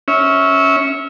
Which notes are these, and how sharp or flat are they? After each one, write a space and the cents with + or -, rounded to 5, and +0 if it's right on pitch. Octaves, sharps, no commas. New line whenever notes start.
C#4 +0 E5 -25